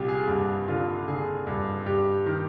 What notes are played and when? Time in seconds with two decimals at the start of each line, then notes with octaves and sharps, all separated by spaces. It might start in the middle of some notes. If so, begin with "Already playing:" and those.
Already playing: C2 A#2 F4 G4
0.08 G#4
0.28 G2 G4
0.68 D3 F4
1.08 D3 G#4
1.47 G2
1.86 G2 G4
2.26 D#3